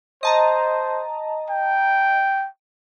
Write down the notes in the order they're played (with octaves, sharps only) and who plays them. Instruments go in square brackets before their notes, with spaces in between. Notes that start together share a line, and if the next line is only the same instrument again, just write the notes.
[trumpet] C5 [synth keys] D#5 A5 A#5
[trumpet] G5